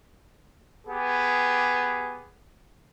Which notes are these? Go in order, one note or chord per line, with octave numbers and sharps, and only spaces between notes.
B3 G4 G#4